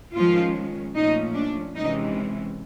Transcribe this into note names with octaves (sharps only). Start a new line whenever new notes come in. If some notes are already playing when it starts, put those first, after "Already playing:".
D#3 F3 G#3 C#4 F4
A#2 F3 A3 C#4 D#4
D4
C3 E3 G#3 C#4 D#4